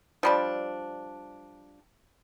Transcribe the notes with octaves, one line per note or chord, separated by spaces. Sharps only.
F3 G3 D4